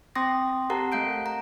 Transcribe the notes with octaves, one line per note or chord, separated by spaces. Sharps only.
C4 G5 C6 D#6 A#6
C4 G4 A#4 F#5 A5 A#5
A3 F5 F#5 G6 D7
A#5